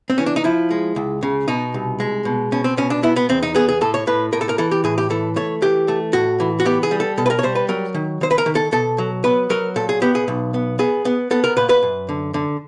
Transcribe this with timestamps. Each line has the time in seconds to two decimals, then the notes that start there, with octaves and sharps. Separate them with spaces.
0.10 C4
0.18 E3 C#4
0.26 D4
0.36 D#4
0.44 F3 E4
0.71 G#3
0.96 C#2
1.23 C#3
1.48 B2 D#4
1.74 C2
2.00 G#3
2.25 B2
2.52 B2 C#4
2.64 C4
2.77 B2 C#4
2.90 D4
3.03 B3 E4
3.16 B3
3.29 E2 C4
3.43 D#4
3.55 B3 G#4
3.69 G#4
3.81 A2 A4
3.94 C#5
4.07 A2 B4
4.33 A2 A#4
4.41 A4
4.49 A#4
4.58 E3 A4
4.71 G4
4.84 A2 G#4
4.98 G4
5.10 E3 A4
5.36 A3 C#5
5.62 E3 G4
5.88 A3
6.13 A2 F#4
6.40 E3
6.60 F#4
6.65 B3 G4
6.83 G#4
6.91 G3
7.00 A4
7.18 B2 A4
7.26 B4
7.30 A#4
7.39 C#5
7.43 G3 C5
7.55 B4
7.69 F#3 A#4
7.94 D#3
8.21 D#3 C5
8.31 B4
8.38 A#4
8.46 D#3
8.55 A4
8.72 B2 A4
8.98 F#3
9.24 B3 B4
9.50 F#3 A#4
9.76 A#2 A4
9.89 G#4
10.02 B3 G4
10.15 G#4
10.28 B1
10.54 B3
10.79 B3 G#4
11.05 B3
11.31 B3 A4
11.44 A#4
11.57 A#2 B4
11.69 B4
11.83 F#2
12.09 D3
12.34 D3